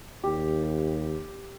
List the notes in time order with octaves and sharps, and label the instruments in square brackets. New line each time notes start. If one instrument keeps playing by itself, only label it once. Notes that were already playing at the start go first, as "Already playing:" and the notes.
[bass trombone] D#2 [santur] G4